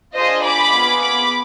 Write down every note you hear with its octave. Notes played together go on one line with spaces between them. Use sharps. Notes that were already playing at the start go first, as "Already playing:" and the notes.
D4 F4 G#4 C5 D#5
B5 D6
B3 F4 G#4
B5 D6